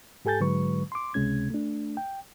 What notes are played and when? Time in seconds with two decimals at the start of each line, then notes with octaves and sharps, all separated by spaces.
0.25 G#2 G4 A4 G#5 G6 A6
0.40 G#2 D3 F#3 G#3 B4 C#6
0.92 C6 D6
1.14 C#2 C3 G#3 C#4 G#6
1.50 A3 D4
1.97 G5